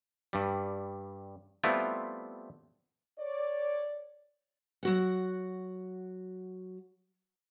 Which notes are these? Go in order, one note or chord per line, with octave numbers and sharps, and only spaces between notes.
G2 G3
G3 A3 B3 C4 E4 F4
C#5 D5
F#3 F#4 F#5